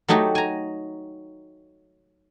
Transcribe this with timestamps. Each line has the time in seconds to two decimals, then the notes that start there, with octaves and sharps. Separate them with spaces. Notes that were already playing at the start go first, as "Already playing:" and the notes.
0.08 F#3 A3 D#4 F#4 G4
0.35 G#5 A#5